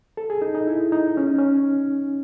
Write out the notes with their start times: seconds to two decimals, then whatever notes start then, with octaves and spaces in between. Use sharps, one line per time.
0.17 A4
0.30 G#4
0.42 D#4
0.55 D#4
0.67 E4
0.92 D#4
1.17 C#4
1.27 D#4
1.39 C#4